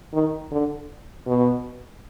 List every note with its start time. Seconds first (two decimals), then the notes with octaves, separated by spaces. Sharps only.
0.13 D#3
0.51 D3
1.27 B2